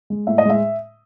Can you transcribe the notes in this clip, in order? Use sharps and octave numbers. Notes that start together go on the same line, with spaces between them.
G#3
A2 E5
D#5
G#3 E5